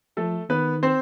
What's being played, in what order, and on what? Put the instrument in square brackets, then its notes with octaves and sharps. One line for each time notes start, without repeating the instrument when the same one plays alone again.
[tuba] F3 [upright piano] A3 A4
[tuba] D#3 [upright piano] B3 B4
[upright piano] C4 C5